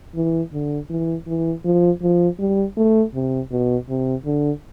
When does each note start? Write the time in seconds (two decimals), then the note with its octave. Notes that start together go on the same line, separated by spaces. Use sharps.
0.15 E3
0.53 D3
0.90 E3
1.27 E3
1.65 F3
2.02 F3
2.39 G3
2.77 A3
3.14 C3
3.51 B2
3.89 C3
4.25 D3